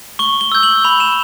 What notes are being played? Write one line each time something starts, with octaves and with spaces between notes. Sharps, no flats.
C#6 G7
G7
E6 G6
F#7
B5 F7
E7